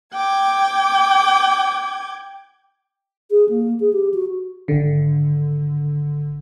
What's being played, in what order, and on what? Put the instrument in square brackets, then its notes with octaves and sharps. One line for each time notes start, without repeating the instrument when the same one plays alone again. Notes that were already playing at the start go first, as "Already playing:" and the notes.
[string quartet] G5 D6 G#6
[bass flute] G#4
A#3
G#4
G4
F#4
[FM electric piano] G#1 D3